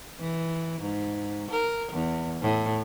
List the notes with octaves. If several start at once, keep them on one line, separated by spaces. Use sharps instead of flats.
E3
G#2
A#4
E2
A2